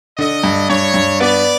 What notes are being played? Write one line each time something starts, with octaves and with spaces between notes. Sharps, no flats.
D3 D#5
G2
G2 C#5
G2
B3 D5